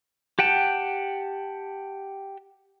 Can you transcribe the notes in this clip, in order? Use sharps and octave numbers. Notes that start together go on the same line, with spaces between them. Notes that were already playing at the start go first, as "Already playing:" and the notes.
G4 F#5 G5 A5